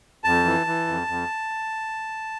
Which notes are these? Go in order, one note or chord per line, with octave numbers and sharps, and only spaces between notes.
F2 A5
E3
E3
F2
F2